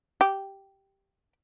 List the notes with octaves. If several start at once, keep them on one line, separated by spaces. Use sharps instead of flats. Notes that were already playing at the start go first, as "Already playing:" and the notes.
G4